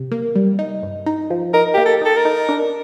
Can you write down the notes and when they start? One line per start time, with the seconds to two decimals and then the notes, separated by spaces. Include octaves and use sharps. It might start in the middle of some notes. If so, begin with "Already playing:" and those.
Already playing: C3
0.11 A#3
0.35 G3
0.59 D#4
0.83 G2
1.06 D#4
1.30 F3
1.54 D#4 A#4
1.74 A#3 G4
1.86 A4
2.02 D#4 A4
2.17 A#4
2.25 D#4
2.49 D4